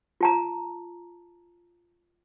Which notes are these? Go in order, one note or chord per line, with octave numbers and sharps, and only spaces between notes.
F4 A5 A#5